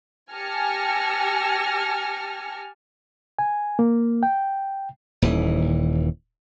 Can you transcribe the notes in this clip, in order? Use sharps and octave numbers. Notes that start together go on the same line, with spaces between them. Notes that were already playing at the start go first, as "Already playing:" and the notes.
G4 G#5 A5 F6 A#6 C#7
G#5
A#3
G5
D#1 D#2 E3